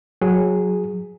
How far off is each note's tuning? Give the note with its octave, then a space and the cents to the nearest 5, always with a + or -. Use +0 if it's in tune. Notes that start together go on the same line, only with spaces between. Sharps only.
F#3 -15 G#4 +0